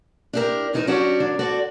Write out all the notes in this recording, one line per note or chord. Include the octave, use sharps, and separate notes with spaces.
D4 E4 G4 G#4 A#4
D2 E3 D#4 A4 A#4 C5
F#3 C#4 D4 F#4 G4 D5
D#3 F#3 D4
F#4 A4 C5 D5